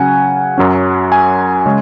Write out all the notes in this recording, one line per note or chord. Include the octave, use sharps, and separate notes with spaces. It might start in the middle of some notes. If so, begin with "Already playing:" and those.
Already playing: C#3 F#3 C#4 F#5 G#5
F#2 F#3 C#4
G#5
C#3 G#3 C#4